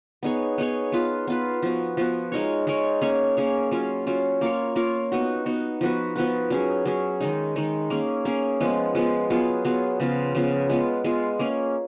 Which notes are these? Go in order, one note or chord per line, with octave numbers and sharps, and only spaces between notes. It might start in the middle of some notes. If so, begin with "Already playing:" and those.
B3 D#4 G#4 C#5
B3 D#4 G#4 C#5
B3 F4 B4
B3 F4 B4
F3 B3 F#4
F3 B3 F#4
G#3 D#4 A#4 C#5
G#3 D#4 A#4 C#5
A#3 C#4 G#4 C#5
A#3 C#4 G#4 C#5
F#3 C#4 F4
F#3 C#4 F4
A#3 F4 A#4 C#5
A#3 F4 A#4 C#5
B3 D#4 F#4
B3 D#4 F#4
F3 B3 F#4 B4
F3 B3 F#4 B4
F#3 C#4 G#4
F#3 C#4 G#4
D#3 G#3 D#4
D#3 G#3 D#4
A#3 C#4 G#4
A#3 C#4 G#4
F3 G#3 B3 F4
F3 G#3 B3 F4
F#3 B3 F4 G#4
F#3 B3 F4 G#4
C#3 F3 B3 F4
C#3 F3 B3 F4
G#3 B3 F4
G#3 B3 F4
A#3 C#4 G#4